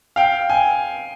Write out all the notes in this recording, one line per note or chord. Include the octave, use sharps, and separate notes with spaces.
F5 G5
G#5